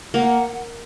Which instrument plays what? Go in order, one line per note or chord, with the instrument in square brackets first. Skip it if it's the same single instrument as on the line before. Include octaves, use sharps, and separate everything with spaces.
[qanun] A#3 [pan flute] F#5